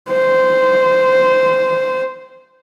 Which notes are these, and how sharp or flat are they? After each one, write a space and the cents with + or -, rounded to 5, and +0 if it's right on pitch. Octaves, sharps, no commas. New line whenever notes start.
C5 -15